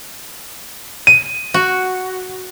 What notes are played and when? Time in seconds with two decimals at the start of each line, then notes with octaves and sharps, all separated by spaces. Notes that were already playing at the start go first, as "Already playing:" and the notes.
1.07 D#7
1.54 F#4